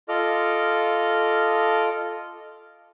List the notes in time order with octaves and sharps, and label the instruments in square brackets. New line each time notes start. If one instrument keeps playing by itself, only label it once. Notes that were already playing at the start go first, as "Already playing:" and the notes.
[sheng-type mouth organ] F4 A4 D#5 D6 F6